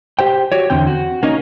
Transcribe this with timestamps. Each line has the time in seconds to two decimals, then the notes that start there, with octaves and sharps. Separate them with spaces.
0.19 G4 C5 G5
0.52 F#4 G4 C#5
0.70 E2 D3 C4 G5
0.87 F#4
1.23 A#3 C#4 D#4